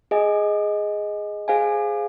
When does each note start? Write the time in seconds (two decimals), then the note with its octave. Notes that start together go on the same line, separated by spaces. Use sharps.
0.11 G#4 D#5 G#5
1.48 G#4 C5 F5 G#5